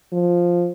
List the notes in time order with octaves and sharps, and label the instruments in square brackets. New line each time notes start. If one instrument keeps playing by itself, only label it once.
[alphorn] F3